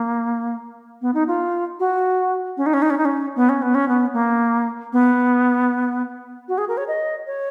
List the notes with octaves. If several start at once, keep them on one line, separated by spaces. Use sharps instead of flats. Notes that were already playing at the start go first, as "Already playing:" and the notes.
Already playing: A#3
B3
D#4
F4
F#4
C#4
D#4
C#4
D#4
C#4
D#4
C#4
B3
C#4
B3
C#4
B3
A#3
B3
F#4
G#4
A#4
C#5
D#5
C#5